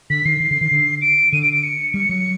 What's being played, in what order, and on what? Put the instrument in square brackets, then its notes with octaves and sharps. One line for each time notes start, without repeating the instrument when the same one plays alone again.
[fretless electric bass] D3 [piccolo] B6
[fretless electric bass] D#3 [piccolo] C7
[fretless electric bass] D#3
D3
D#3
D3
[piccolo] D7
[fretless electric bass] D3 [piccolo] D#7
[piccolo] D7
D7
C#7
[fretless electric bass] G3 [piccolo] C#7
[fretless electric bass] F#3